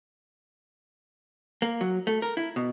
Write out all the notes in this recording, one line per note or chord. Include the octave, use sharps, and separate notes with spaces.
A#3
F#3
A3
A#4
E4
B2